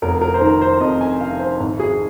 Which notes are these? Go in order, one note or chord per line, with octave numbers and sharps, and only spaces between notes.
F1 A#4
A#4
C5
D#3 A#4
C5
F2 D#5
G#5
C3 F5
C5
G#1
G#4